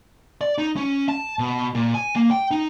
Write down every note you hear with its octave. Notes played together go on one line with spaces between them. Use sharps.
D5
D#4
C#4
A5
B2
A#2
G#5
A#3
G5
D#4